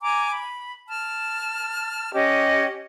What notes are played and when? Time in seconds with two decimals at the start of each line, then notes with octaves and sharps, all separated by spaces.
0.02 G#5 A#5 D6
0.31 B5
0.88 A5 F6
2.14 C#4 G4 D#5